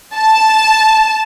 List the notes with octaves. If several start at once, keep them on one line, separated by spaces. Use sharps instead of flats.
A5